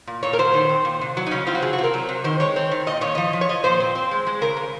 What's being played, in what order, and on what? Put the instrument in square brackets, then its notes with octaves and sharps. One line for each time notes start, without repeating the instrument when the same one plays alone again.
[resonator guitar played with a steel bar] A#2
A#2 C#5
A#4
F#3 C5
D#3
C4
A#2
C3
F#3
D#4
C#3 C#4
C4 F4
F#4
C3 G#4
F#4
C4 A#4
F#3
C3
D#3 C5
G#3 C#5
C4
D#3
A#2 D#5
A#2 C#5
F3 D#5
F3
C#5
F3 D#5
A#2 C5
C4
C4
G#3
G#3
C#3 A#4
C#3